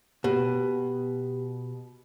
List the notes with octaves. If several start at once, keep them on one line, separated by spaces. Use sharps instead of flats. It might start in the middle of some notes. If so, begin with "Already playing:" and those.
B2 G4